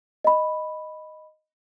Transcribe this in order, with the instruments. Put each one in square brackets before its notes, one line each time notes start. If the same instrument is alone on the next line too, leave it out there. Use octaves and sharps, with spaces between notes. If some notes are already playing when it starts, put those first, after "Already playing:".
[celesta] D#5 B5